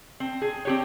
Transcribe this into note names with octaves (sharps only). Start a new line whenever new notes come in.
C4
G#4
C4 G4 C#5